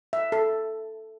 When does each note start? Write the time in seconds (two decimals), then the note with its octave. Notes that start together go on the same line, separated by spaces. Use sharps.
0.13 E5
0.32 A4